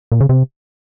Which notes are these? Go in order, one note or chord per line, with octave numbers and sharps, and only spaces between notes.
A#2
C#3
C3